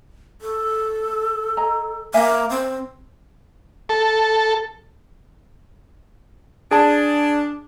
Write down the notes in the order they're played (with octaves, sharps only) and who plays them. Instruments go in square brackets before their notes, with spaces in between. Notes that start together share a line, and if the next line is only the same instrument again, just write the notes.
[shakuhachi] A4
[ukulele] D#5 G#5 A#5
[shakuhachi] A#3 [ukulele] E5 F5 G#5
[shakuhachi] C4
[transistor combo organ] A4
[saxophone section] D4 [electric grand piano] G#4 A5